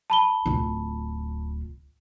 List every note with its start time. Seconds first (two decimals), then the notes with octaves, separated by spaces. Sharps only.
0.10 A5 B5 G7
0.46 D1 F4